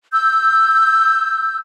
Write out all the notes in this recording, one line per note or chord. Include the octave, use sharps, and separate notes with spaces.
E6 G6